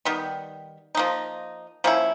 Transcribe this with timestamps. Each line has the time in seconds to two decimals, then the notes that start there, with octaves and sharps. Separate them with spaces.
0.05 D#3 G3 B3
0.95 F3 A#3 D#4
1.84 F3 A#3 C#4 E4